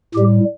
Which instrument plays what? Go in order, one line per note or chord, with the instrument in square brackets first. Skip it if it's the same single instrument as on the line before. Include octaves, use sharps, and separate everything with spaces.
[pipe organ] A2 G3 G4